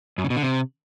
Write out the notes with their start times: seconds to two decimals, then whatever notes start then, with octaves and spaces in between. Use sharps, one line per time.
0.18 F#2
0.24 C#3
0.30 B2
0.36 D3
0.42 C3